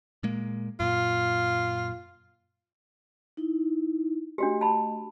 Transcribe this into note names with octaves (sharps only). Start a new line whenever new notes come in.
A#2 G#3 A#3
F#2 A#2 F4
D#4 E4
A3 D4 F#4 G4 D#5
A5 B5